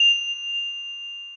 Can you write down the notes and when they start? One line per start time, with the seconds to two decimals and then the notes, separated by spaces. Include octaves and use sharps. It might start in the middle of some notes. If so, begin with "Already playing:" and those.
Already playing: F7